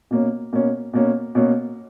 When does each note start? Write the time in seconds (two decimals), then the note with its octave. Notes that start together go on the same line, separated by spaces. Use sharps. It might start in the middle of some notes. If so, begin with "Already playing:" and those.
0.11 B2 A#3 C#4
0.53 B2 A#3 C#4
0.93 B2 A#3 C#4
1.35 B2 A#3 C#4